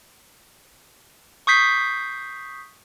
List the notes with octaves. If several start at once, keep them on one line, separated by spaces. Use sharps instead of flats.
C#6 D#6 G6 B6 C7